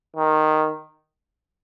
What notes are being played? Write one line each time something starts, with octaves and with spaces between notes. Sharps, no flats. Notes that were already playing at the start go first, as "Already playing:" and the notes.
D#3